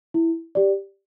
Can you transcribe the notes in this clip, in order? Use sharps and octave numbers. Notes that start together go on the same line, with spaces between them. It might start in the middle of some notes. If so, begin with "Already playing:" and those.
E4
G4 D5